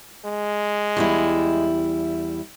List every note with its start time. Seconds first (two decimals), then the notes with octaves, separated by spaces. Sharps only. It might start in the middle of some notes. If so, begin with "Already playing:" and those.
0.25 G#3
0.97 E2 G3 E4